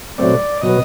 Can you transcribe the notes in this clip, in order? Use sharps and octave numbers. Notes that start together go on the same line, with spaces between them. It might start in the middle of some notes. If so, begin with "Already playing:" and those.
B2 F#3 A3 C4 D5
B2 F#3 B3 D#5